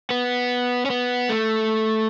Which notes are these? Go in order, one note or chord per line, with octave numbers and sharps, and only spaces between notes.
B3
C#4
B3
A3